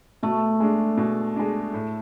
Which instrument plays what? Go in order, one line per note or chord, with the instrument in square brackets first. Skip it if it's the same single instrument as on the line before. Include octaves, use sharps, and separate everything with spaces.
[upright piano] B2 [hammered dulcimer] A3
[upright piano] G#3 D4
B2
G#3 D4
A2